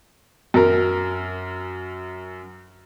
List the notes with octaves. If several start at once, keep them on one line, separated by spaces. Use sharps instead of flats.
F#2 A#4